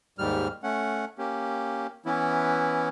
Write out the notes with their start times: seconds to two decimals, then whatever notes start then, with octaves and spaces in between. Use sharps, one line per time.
0.19 D#2 G#2 G3 F6
0.63 A3 C#4 F#5
1.18 A#3 C#4 G4
2.06 E3 B3 C#4 E4